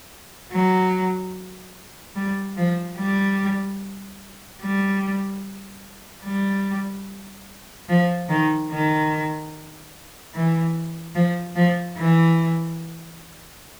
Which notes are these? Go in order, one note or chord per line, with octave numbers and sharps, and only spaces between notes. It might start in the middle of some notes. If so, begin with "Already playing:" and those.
F#3
G3
F3
G3
G3
G3
F3
D#3
D#3
E3
F3
F3
E3